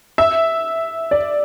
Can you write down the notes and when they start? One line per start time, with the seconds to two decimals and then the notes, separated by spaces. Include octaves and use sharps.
0.18 E5
1.11 D5